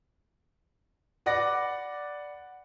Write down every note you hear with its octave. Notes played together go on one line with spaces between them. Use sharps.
B4 D5 F#5 D6 A#6